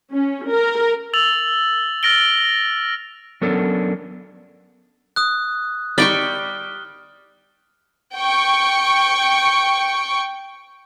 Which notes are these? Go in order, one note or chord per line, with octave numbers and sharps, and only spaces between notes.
C#4
A#4
E6 A6 F7 F#7
F6 A6 A#6 D7 G7
F#3 B3 C#4 D4 A4 A#4
D#6 F#6
G3 D#4 D5 G5 C#6 F6 G7
G5 C#6